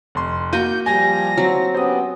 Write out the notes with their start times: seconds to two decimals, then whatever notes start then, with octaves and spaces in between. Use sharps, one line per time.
0.15 F1 C6
0.53 A#3 F#4 G6 D#7
0.86 F3 G3 G#5 A#6
1.37 F#3 C4
1.74 B3 C#4 G4 C5 D#6